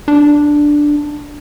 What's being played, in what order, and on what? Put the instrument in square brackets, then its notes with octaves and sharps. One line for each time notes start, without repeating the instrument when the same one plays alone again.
[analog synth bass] D4